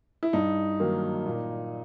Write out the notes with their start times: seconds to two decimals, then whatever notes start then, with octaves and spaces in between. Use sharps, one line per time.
0.23 E4
0.33 G2 D#4
0.80 D#3 F#3 A#3
1.26 A#2